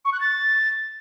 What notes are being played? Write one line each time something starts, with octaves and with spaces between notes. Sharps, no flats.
C#6
F#6
A6